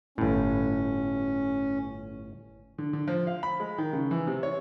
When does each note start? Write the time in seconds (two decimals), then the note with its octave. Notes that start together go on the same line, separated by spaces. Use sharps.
0.18 G1 A2 C#4
2.78 D3
2.93 D3
3.08 F3
3.27 F5
3.43 B5
3.60 G#3
3.78 D#3
3.93 C#3
4.11 E3
4.27 C3
4.43 C#5